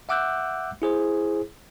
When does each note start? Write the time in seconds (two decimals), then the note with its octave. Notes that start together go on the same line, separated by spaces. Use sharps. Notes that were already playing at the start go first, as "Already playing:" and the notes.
0.09 E5 F#5 D6 E6 F#6 G6
0.82 E4 G#4 C5